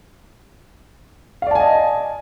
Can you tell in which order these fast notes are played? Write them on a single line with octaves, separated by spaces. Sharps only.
F5 D5 A5 G#5 D#5